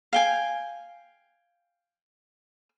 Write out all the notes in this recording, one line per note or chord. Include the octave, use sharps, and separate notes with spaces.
F5 G5 G#5